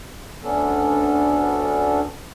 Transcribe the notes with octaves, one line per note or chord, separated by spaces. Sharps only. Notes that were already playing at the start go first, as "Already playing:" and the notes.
D2 B3 C#4 D4 A4